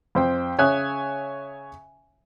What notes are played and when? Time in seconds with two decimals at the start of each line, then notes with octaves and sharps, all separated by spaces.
0.15 F2 C5 G5
0.58 C#3 C#5 E5 G#5 D#6 F#6